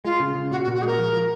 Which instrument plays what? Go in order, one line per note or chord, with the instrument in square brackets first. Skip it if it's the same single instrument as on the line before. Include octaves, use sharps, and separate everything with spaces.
[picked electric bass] G#3 [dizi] F4
[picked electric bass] C#3
C#3
[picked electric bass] A#2 [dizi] F#4
[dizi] F#4
[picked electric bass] A#2
[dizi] F#4
[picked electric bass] G#3 [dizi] G#4 A#4
[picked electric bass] F3
F3